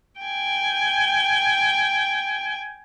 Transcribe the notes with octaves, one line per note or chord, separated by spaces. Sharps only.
G5 G#5